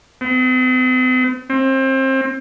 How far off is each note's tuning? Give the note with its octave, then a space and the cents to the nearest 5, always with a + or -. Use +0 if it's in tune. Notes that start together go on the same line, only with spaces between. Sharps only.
C4 -45
C4 +30